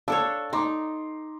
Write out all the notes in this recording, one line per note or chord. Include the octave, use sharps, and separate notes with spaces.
D4 A4 C#5 F5 E6
D#4 A#5 C6 D6